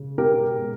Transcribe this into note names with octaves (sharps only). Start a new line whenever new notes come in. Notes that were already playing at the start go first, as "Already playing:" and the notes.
Already playing: C#3
B3 G4 A#4
G#3